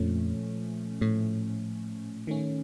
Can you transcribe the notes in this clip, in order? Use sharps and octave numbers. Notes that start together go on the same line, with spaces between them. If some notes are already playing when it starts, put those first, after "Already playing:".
Already playing: F2 A#2 F3 A3 C#4
A2
D#3 A3 C#4